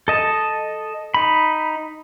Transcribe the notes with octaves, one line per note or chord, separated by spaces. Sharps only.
A4 D#5 A5
D#4 B5